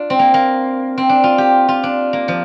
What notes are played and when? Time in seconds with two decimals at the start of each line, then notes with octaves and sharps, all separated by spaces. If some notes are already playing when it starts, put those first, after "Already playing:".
Already playing: D4 F4
0.10 C4
0.19 A#3
0.34 A#3
0.98 C4
1.09 D4
1.24 F4
1.38 G4
1.68 F4
1.84 D4
2.13 A#3
2.28 F3